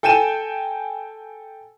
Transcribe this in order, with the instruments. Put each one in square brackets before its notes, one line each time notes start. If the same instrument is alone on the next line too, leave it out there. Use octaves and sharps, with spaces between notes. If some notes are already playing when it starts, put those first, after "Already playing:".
[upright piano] A4 G5 G#5 D#7 E7